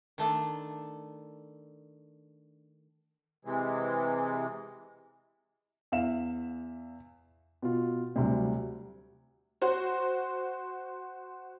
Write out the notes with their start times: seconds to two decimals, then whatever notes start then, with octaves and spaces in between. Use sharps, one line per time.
0.18 D#3 A3 D4
3.45 C3 E3 G#3
5.92 E2 E5 F5 E7
7.62 B2 F4
8.16 D2 C3 F#3 G3
9.62 F#4 C5